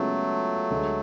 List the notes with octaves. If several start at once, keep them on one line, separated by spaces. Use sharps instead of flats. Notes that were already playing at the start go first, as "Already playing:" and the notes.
Already playing: C#3 F#3 G#3 A3 B3 F4 A4
D2 D3 G#3